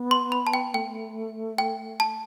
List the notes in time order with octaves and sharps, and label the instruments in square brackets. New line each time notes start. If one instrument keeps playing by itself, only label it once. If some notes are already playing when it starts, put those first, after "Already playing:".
Already playing: [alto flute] B3
[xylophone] C6
B5
A5
G5
[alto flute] A3 [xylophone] G5
[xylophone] G5
A5